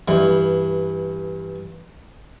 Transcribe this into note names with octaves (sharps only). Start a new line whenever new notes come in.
G2 E3